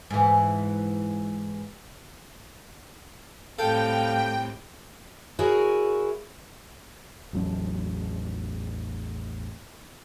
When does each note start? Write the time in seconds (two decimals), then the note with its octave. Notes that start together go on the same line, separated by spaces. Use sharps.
0.11 G#2 E3
3.59 A2 C3 G3 A4 F5 G5
5.39 E4 F#4 G#4 A#4 C#5
7.33 A1 E2 F#3 C#4